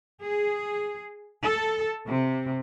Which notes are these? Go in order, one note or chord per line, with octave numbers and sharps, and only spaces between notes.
G#4
A4
C3